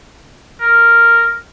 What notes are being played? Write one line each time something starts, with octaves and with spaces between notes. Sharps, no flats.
A#4